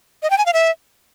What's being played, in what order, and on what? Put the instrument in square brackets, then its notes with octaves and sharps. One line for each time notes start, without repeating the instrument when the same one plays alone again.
[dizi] D#5
G5
G#5
F5
E5